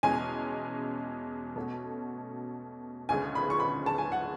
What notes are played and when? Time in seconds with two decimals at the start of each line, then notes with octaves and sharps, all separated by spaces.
0.03 E2 B2 G#3 C#4 G#5
1.56 B2 A3 C#4 F#4
3.09 D2 C#3 G#3 C#4 G#4 G#5
3.35 B5
3.50 C#6
3.60 B5
3.86 A5
3.98 G#5
4.12 F#5